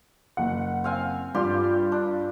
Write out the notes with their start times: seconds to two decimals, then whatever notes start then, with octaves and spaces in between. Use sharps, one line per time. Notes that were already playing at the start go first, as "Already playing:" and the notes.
0.37 F#1 F#5
0.84 C4 F5 G#5
1.34 G2 F4 G4 D5 C6
1.92 D4